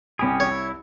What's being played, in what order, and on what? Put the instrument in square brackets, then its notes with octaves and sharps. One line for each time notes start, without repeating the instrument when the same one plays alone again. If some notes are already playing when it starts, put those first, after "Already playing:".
[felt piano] C2 B5 [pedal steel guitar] C#4 G4 G#4
[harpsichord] C#5
[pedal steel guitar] E4